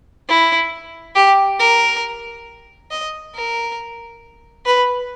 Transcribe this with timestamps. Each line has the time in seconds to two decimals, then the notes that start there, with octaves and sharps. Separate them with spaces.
0.28 E4
1.15 G4
1.59 A#4
2.90 D#5
3.35 A#4
4.65 B4